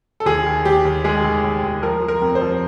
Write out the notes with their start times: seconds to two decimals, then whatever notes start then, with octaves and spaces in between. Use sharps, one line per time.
0.20 A4
0.26 D#2 G#4
0.46 D#2
0.65 D#2 G4
0.85 D#2
1.04 G#3 G#4
1.24 D#2
1.44 D#2
1.63 D#2
1.82 F3 A#4
2.03 F3
2.08 A#4
2.22 F2
2.35 C5
2.42 F3